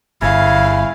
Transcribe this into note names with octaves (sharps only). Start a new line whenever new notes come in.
G1 C#3 E4 F5